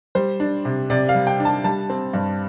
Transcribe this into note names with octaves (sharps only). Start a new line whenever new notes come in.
G3 C5
D4
C3
C3 D5
F5
G3
G5
D4
A5
G3 A5
C4
G2